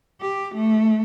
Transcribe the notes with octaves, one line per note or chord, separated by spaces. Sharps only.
G4
A3